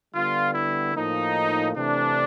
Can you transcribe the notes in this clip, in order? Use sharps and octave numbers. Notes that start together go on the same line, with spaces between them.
D3 G3 B3 F4
E4
A2 F3 A#3 D#4
C3 E3 A3 D4